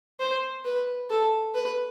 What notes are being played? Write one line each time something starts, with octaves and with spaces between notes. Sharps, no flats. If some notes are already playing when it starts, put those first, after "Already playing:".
C5
B4
A4
B4